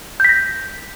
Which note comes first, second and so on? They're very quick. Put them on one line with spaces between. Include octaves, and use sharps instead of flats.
G6 B6 A#6